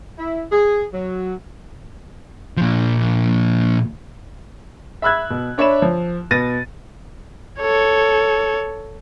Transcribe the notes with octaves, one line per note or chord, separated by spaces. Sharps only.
E4
G#4
F#3
A#2 F3
E5 B5 E6 F#6 G#6
B2
D4 C#5 E5 B5 E7
F3
B2 B4 A6 A#6 D#7
A4 C#5